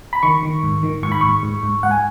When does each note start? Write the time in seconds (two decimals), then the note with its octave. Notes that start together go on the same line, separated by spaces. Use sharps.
0.13 B5
0.23 D#3 C#6
0.43 D#3
0.63 G#2
0.83 D#3
1.03 G#2 C#6
1.12 B5
1.21 G#2 C#6
1.43 G#2
1.63 G#2
1.83 G#2 F#5
1.91 G#5